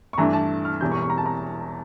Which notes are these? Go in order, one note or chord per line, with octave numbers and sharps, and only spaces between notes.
C#6
G2 E3 A3 D4 A#5
A5
F6
E1 E2 E3 G3 G6
C#6
C#6
A#5
A5
A#5